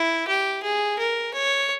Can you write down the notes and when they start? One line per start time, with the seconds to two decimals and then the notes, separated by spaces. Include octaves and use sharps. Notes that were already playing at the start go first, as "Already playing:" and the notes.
Already playing: E4
0.28 G4
0.63 G#4
0.99 A#4
1.34 C#5